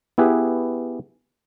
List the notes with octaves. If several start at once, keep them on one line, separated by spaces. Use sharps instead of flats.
B3 E4 G4 G#4 B4